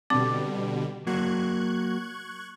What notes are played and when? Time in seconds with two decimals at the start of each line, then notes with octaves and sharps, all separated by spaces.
0.10 B2 D3 G3 C4 D6
1.07 F#3 A#3 F#4 C#6 F#6 G#6